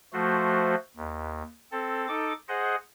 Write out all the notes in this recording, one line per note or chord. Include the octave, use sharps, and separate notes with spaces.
F3 A3 F#4 C5
D#2
C4 A4
D#4 A4 D6
G#4 C5 D#5 F#5